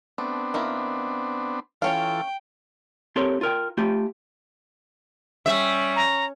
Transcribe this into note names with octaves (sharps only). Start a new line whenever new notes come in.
A3 B3 C4 D4
D#3 A#3 E4
E3 C#4 F4 A4 C#5 F5 G5
C4 G4 A4 A#4 C#5 C6
F4 A#4 G5
A3 F4 G4
G3 C#4 C#5 E5
A#5